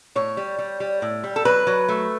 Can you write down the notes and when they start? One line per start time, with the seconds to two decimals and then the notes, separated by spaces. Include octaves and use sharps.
0.15 A2 C#5
0.37 G3
0.59 G3
0.80 G3
1.02 A2
1.24 G3
1.36 A4
1.45 F#3 B4
1.67 F#3
1.89 A3